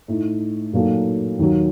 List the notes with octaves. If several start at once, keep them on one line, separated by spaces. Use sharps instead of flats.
A2 A3 D#4
A#2 F#3 A#3 D#4 A4
D#2 D#3 F#3